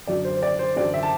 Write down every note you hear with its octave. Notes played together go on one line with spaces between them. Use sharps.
F#2 D3 F#3 D5
C5
C5
D5
C5
F#2 D3 F#3 D5
E5
A5